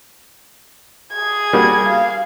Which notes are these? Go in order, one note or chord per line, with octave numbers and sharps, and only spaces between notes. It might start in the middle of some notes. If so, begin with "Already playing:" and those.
G#4 G#6
G3 A#3 F#4
F5